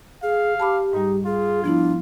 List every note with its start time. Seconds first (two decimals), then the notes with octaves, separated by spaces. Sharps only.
0.23 G#4 F5
0.60 G4 A5 B5 D6
0.93 G#2 G3 D#4
1.25 F4 G#4
1.64 F3 B3 D4 E4